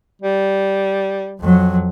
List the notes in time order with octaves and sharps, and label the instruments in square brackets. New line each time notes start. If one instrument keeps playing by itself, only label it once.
[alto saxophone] G3
[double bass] F2 F#3